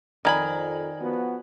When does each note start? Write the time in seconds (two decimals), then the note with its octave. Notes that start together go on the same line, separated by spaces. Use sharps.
0.25 F2 D#3 D5 G#5 A#5 B5 G#6
1.00 F3 B3 F#4